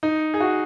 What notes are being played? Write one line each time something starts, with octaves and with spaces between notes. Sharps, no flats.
D#4
G#4
F#4